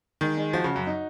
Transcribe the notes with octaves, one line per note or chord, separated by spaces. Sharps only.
D#3 G#3
G#3
F3 F#4
C#3
F#4
F#2
D#4